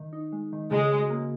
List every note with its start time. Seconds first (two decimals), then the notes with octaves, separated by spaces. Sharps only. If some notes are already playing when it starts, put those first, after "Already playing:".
Already playing: D#3
0.13 D#4
0.32 G#3
0.53 D#3
0.71 C#3 G#3
0.91 F#4
1.10 A#3